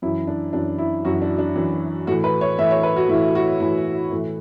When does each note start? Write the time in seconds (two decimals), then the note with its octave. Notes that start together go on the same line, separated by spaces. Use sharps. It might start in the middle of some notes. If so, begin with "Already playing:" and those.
0.02 F#2 E4
0.06 E3
0.27 D4
0.53 F#2 E3 D4
0.78 E4
1.05 F#2 E3 F#4
1.22 D4
1.38 D4
1.55 F#2 E3
2.07 A2 E3 F#4
2.24 B4
2.41 C#5
2.58 A2 E3 E5
2.71 C#5
2.83 B4
2.96 F#4
3.09 A2 E4
3.13 E3
3.35 F#4
3.60 A2 E3 E4
4.12 A2 E3